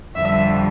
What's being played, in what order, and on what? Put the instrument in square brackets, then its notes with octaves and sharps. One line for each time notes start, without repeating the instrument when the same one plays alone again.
[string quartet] F2 D3 G3 E5